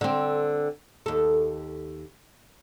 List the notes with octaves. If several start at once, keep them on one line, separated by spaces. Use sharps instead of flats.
D3 C4
D#2 A4